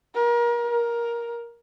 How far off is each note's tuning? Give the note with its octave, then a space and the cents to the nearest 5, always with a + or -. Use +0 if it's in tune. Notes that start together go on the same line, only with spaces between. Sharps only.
A#4 +30
A#4 +15